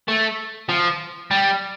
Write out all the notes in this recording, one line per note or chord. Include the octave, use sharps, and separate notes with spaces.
A3
F3
G3